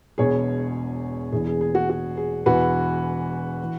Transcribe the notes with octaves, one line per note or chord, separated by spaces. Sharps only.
E1 E2 B2 G#4 C#5
E1 E2 E3 G#4
G#4
G#4
F#4
F#4
G#4
E1 E2 E3 F#4 B4
E3